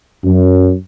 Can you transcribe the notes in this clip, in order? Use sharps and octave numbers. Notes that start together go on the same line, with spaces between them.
F#2